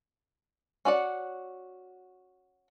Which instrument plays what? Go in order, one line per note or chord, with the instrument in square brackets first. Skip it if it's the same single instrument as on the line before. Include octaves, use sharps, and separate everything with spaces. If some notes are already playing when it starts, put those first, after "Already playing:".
[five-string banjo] C#4 F#4 D5 F#5